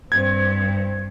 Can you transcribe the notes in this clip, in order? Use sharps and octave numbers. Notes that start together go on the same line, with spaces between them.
G2 C4 G#6